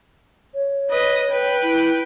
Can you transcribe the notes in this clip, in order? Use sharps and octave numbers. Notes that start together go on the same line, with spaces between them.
C#5
B4 D#5
B4 G5
E4